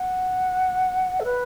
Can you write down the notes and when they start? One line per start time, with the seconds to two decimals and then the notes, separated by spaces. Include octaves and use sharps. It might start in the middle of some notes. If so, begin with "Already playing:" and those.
Already playing: F#5
1.20 A4
1.24 B4